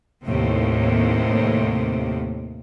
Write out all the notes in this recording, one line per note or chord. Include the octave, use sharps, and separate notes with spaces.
D#2 A2 C3